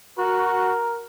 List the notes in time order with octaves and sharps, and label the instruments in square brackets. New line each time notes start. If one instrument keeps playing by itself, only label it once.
[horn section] F#4 [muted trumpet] A#4